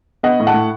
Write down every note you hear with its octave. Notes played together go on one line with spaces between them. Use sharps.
B3 D#5 F#5
A2
F#5 A5
A2